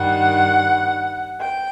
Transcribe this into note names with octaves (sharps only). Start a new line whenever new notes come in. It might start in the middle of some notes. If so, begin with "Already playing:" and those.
Already playing: G2 D#3 G3 F#5
G5